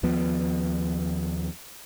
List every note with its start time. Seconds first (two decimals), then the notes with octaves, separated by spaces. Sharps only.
0.03 D#2 F3 B3